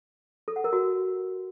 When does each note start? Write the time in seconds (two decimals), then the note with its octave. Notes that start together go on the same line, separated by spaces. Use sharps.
0.48 A4
0.56 F#5
0.64 A#4
0.73 F#4